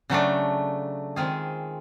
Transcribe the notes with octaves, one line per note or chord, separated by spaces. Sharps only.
C#3 F#3 A3 D4
D#3 G#3 C4 F4 G#4